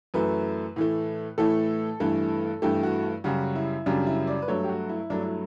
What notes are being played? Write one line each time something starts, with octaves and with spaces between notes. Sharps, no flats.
F#2 E3 A3 B4
A2 E3 A3
A2 E3 A3 A4
G2 E3 A3
G2 E3 A3 G4
F#4
F#2 C#3 G3 F#4
E4
F#2 C#3 G3 D4
E4
D5
B4
G2 F#3 A3 C#5
G4
F#4
E4
G2 F#3 A3 D4
E4